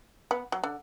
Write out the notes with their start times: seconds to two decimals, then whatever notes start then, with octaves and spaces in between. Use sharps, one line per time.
0.31 B3
0.52 F#3
0.64 D3